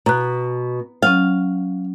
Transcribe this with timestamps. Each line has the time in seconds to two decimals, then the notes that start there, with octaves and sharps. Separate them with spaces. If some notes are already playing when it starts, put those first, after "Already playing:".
0.06 B2 A#5 F#6
1.03 F#3 C#4 F5